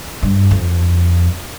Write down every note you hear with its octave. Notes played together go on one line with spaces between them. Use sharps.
G2
F2